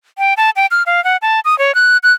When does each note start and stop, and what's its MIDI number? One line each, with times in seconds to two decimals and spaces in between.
0.18 0.34 79
0.37 0.50 81
0.56 0.66 79
0.71 0.83 89
0.86 1.03 77
1.04 1.17 78
1.22 1.40 81
1.45 1.57 87
1.59 1.74 73
1.75 1.97 90
2.03 2.13 90